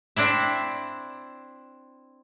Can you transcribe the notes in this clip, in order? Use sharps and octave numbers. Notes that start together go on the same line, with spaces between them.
C4 D4 E4 E5